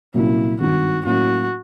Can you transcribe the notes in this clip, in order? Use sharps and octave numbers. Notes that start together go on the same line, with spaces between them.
C2 A#2 F#3 A#3 C#4 E4
G#1 G2 D#3 F#4
A2 F#3 A#3 C#4 F#4